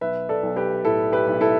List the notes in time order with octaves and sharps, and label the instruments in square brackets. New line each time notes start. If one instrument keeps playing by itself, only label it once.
[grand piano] B1 B4 E5
A4 D5
B1
G4 B4
A2 E4 A4
G4 B4
B1
E4 A4